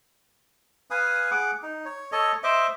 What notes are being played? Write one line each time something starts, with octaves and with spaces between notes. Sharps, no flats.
B4 F5 G#5 D#6
G#4 F#5 D6
D#4
C#5
A4 C#5 D#5
C5 D#5 E5 D6